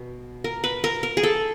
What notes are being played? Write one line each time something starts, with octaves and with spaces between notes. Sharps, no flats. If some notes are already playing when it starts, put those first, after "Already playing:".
Already playing: B2
A#4
B4
A#4
A#4
G#4
A4